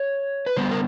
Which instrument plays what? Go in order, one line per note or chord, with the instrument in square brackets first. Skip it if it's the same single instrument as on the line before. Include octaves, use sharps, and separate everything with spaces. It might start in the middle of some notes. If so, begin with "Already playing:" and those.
Already playing: [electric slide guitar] C#5
B4
D3 G3 B3 C5
A#4